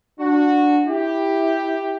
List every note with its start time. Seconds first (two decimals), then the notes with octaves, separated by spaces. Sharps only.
0.20 D4 F#4
0.87 E4 G4